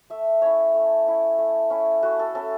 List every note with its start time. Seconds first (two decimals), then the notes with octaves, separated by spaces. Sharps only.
0.10 A3 E5
0.42 C#4 E4 C#5
0.74 A3
1.06 C#4 E4
1.38 A3
1.70 C#4 E4
2.03 A3 F#4
2.19 A4
2.35 C#4 E4 A4